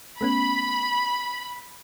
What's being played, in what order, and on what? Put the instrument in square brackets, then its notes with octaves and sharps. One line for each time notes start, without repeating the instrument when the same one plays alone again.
[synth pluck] A3 B3 C#4 [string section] B5